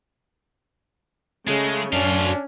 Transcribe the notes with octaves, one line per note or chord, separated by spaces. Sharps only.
C#3 G#3 A3
F#2 A2 C#4 D4 F4